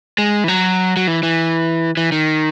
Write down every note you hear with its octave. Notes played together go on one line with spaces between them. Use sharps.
G#3
E3
F#3
F#3
E3
E3
E3
D#3